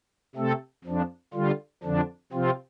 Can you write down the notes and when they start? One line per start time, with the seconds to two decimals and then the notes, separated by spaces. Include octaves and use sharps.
0.36 C3 A3 C4 A4
0.84 F2 F3 D4
1.34 D3 G3 F4
1.83 F2 D3 F3 D4
2.33 C3 F3 C4 F4